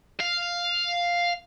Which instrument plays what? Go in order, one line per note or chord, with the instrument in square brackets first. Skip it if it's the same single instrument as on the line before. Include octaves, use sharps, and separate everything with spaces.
[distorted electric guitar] F5